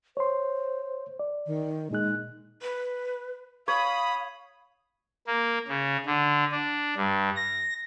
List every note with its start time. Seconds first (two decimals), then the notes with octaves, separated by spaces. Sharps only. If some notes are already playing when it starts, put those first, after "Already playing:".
0.17 C5 C#5 C6
1.19 D5
1.46 D#3
1.91 A#2 G#3 D#4 F#6
2.62 B4
3.68 C#5 F5 B5 D#6
5.27 A#3
5.68 C#3
6.06 D3
6.52 D4
6.97 G2
7.36 A#6